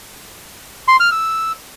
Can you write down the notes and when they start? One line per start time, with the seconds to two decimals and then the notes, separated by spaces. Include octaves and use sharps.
0.88 C6
1.00 F6
1.12 E6